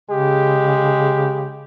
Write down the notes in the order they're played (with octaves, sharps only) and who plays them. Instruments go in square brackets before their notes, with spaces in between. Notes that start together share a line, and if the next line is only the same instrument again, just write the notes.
[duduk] C#3 [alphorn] G#3 [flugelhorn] G4